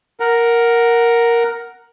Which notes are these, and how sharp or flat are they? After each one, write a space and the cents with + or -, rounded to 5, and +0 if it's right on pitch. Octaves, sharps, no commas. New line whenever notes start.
A#4 +5 F#5 +0